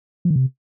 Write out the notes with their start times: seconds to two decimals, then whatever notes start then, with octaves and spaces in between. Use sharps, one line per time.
0.25 F3
0.30 D#3
0.36 C3